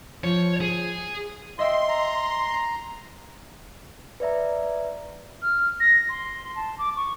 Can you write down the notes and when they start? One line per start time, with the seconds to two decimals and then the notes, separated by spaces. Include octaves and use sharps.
0.24 F3 C#5
0.61 G#4
1.59 D#5 E5 G5 C6
1.89 A#5
4.20 B4 D5 E5 A#5
5.42 F6
5.80 A#6
6.09 C6
6.56 A5
6.79 D6
6.96 C#6